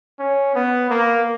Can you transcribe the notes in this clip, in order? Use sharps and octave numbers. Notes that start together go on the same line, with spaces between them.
C#4
B3
A#3